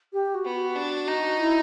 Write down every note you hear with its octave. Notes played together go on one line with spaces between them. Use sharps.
G4
F#4
B3
F#4
D4
D#4
E4